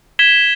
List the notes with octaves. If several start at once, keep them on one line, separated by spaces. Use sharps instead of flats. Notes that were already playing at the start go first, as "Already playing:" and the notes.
G#6 B6 E7 G7